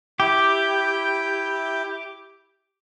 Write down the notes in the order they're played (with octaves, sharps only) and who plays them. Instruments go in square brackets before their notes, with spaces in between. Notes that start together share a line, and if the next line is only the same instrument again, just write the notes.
[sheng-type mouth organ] E4 G5 [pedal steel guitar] G4